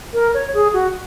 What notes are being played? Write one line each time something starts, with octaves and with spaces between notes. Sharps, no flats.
A#4
C#5
G#4
F#4